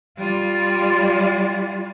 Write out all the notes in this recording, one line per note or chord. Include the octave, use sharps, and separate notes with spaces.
G3 F4